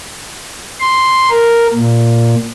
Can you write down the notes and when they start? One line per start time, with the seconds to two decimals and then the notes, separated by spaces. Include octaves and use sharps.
0.80 C6
1.30 A#4
1.74 A#2